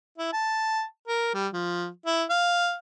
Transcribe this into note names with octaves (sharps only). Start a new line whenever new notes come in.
E4
A5
A#4
G3
F3
E4
F5